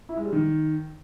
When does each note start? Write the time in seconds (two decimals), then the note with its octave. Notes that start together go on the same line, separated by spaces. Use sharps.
0.09 E4
0.17 G#3
0.25 G3
0.33 D#3